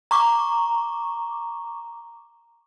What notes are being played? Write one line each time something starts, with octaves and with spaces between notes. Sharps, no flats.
A#5 C#6 D6